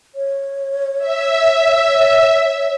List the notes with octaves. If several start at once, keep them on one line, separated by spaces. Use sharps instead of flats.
C#5
E5